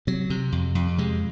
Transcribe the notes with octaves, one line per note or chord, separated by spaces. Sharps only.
C3 F#3
C3
F2
F2
C3 G#3